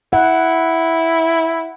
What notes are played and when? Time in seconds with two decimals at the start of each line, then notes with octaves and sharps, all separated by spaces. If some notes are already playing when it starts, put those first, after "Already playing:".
0.13 E4 F#5